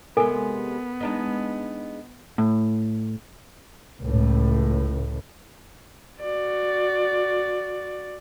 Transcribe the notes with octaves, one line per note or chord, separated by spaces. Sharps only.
C3 G#3 B3 A4 A#4 G#5
G#3 D4 D#4
A2
C#2 A2
F#4 D5